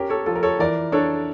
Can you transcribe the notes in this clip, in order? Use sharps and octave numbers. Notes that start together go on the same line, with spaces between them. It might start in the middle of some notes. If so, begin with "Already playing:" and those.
Already playing: C#4 G4 A#4
A4 C#5
F3 F4 A4
A#4
A4 C#5
E3 A#4 D5
D4 A4 C#5